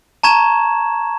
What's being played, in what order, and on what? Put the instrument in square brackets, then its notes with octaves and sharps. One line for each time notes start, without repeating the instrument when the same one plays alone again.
[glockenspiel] A5 A#5 C#6 G#6 E7